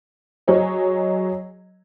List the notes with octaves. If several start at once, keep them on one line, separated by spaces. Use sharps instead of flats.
F#3 G#4 C#5 D#5